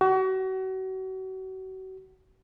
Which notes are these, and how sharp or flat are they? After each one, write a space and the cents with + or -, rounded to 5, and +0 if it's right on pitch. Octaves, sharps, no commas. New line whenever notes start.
F#4 +35